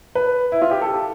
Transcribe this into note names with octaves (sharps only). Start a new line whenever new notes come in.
B4
E4
F4
G4
A4